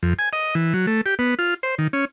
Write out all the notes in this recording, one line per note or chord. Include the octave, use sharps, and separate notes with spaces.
F2
G#5
D#5
E3
F#3
A3
G4
B3
F4
C5
D#3
C#4